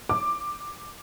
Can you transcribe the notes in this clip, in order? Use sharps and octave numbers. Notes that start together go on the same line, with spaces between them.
D6